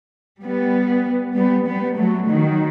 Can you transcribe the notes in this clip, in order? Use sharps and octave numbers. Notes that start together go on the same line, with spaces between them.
G3 B3
G3 B3
G3 B3
F#3 A3
D#3 F#3